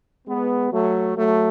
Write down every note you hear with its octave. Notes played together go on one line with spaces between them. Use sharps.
G#3 B3
F#3 A3
F#3 A3